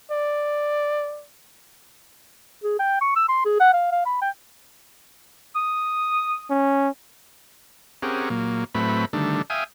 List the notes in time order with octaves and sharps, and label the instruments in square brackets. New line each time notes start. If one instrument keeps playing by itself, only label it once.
[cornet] D5
[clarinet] G#4
G5
C#6
E6
C6
G#4
F#5
F5
F5
B5
G5
[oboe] D#6
[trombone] C#4
[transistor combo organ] C4 C#4 G4 G#4 A#4 F#5
A#2 F#3 A#3
A2 F#3 A3 C4 B4 B5
D3 D#3 G3 A3 D4
E5 F5 G5 G#5 D#6